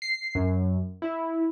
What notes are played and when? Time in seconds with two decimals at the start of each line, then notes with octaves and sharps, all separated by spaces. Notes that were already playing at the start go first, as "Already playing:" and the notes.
0.02 C7
0.35 F#2
1.02 E4